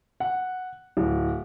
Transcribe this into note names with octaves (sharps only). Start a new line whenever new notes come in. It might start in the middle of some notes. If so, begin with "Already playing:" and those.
F#5
D1